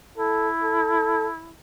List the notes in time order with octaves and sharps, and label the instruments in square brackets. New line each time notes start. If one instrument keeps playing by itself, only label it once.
[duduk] E4 [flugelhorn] A4
[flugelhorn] A4